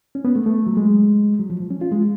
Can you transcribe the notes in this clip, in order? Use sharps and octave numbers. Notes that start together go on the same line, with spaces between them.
C#4
B3
A3
A3
F#3
G#3
F#3
F3
F3
C#4
F4
G#3